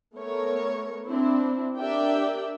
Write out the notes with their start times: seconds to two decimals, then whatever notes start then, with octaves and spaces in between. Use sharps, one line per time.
0.17 A3 B3 A#4 C#5
1.06 C4 D4 E4
1.79 D4 G4 A#4 D5 E5 G5